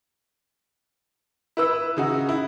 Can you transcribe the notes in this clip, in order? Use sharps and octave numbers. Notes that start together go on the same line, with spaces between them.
E4 B4 E6
C#3 D#4 F#4
E4